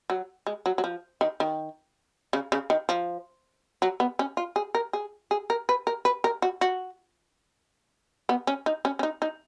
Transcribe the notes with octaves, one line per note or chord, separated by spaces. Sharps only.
F#3
G#3
F#3
F#3
F3
D#3
D#3
C#3
C#3
D#3
F3
F#3
B3
C#4
F4
G#4
A#4
G#4
G#4
A#4
B4
A#4
B4
A#4
F#4
F#4
B3
C#4
D#4
C#4
C#4
D#4
D#4